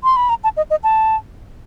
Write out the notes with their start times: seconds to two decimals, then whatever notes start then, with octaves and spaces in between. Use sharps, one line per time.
0.04 C6
0.16 B5
0.29 A#5
0.44 A5
0.57 D#5
0.70 D#5
0.84 A5